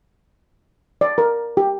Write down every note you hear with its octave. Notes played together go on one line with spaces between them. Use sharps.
D5
A#4
G4